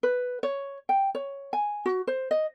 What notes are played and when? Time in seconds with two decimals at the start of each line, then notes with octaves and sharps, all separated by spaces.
0.03 B4
0.43 C#5
0.89 G5
1.15 C#5
1.53 G#5
1.86 F#4
2.07 C5
2.31 D#5